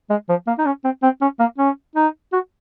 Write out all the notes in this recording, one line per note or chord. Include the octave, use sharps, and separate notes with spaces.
G#3
F3
A#3
D#4
C#4
C4
C4
C#4
A#3
C#4
D#4
F#4